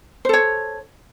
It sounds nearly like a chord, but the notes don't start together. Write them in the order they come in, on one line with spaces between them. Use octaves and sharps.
C5 A4 C#5